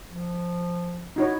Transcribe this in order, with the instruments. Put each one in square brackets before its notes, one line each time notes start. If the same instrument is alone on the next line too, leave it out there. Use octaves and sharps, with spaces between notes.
[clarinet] F3
[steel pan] D#4 F#4 C#5 [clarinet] E4